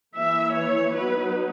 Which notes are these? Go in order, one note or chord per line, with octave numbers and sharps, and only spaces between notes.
E3 A#3 E4 E5
C#5
F#3 B3 D#4 B4